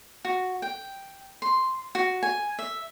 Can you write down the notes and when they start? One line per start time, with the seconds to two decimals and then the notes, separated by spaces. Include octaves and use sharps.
0.25 F#4
0.62 G5
1.42 C6
1.95 F#4
2.23 G#5
2.59 E5